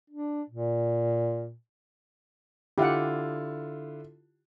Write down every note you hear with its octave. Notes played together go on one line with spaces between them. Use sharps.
D4
A#2
D3 E4 F4 G4 F#5